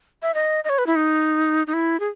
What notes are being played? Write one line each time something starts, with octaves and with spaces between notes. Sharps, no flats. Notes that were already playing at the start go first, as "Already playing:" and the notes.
E5
D#5
D#5
C#5
B4
E4
D#4
D#4
E4
G#4